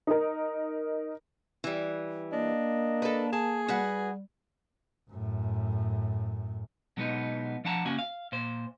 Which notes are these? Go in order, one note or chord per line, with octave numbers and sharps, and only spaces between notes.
D#4 A#4
E3 G3
A#3 D4 D#5
A4 B4
G#4 A5
G3 F#4 B4 F#5
F#2 A2
B2 F#3 G#3 B3 C4 D#4
F3 D4 F#5 A5 A#5
C#3 A#3 C#4 F#4 G#5
F5
A#2 C5